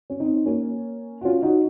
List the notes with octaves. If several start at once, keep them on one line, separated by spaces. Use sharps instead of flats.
C#4
C4 D#4
A#3 C#4
F#4
C#4 F4
D#4 F#4